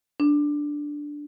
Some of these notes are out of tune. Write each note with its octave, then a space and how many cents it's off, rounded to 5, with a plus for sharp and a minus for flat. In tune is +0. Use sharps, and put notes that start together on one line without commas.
D4 +0